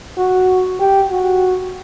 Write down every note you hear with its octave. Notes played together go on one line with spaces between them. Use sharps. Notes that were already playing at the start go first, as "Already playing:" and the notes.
F#4
G4
F#4